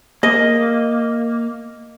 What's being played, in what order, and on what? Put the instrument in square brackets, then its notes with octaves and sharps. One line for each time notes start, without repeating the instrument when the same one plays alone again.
[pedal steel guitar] A#3 [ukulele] D#5